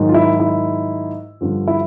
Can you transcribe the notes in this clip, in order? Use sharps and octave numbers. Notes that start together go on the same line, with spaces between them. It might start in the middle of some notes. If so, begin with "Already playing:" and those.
Already playing: G#2 D#3 F#3
F4
E4
E4
G2 D3 F3
E4